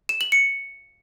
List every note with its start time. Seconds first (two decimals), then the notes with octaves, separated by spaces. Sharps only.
0.09 E7
0.21 F#7
0.32 C#7